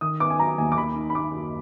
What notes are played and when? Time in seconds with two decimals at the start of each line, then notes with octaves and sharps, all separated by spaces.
0.01 D#3 D#6
0.20 B3 D6
0.30 G#5
0.39 F#3 A#5
0.58 D#2 G#5
0.72 D6
0.77 D#3 B5
0.96 D#4
1.10 B5
1.14 A#3 D6
1.33 F#2